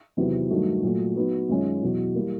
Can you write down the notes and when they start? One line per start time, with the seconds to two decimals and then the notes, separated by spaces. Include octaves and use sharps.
0.17 E2 C3 D#3 F#3 B3
0.50 G2 D#3 F#3 A3
0.83 A#2 F#3 A3
1.16 F#3 B3 D#4
1.49 F#2 D#3 G#3 C#4 F4
1.82 E2 B2 F#3
2.15 E3 G3 A#3